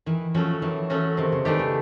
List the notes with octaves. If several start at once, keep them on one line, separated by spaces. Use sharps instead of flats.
D#3 E3
F3 F#3 A3 C#4 F#4
D#3 E3
F#3 A3 C#4 F#4
C3 D#3
C#3
D#3 E3 A3 D4 G4
C#3